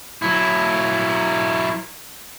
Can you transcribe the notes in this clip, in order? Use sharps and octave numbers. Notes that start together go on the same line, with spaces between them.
F#3 E4